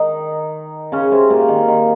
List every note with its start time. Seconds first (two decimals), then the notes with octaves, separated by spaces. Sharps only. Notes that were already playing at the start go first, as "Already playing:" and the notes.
Already playing: D#3 D#4
0.92 C#3 C#4
1.11 C3 C4
1.30 A#2 A#3
1.48 D#3
1.68 D#3